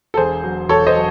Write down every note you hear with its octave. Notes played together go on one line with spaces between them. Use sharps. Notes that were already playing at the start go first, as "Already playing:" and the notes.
A4
E1 G#4 C5
F#3
E1 A4 C#5
C5 D#5
F#3